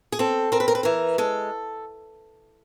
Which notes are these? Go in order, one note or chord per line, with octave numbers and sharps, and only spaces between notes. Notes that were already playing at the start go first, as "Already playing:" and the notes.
G#4
C4 A4
C4 A#4
B4
A#4
B4
E3 A#4
G#3 A4